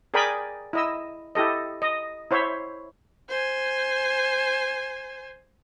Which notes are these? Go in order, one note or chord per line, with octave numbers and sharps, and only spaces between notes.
G#4 A#4 D5 G5 G#5 B5
E4 D#5 E6
E4 G4 A4 D#5
D#5
E4 C5 C#5 E5
C5 G#5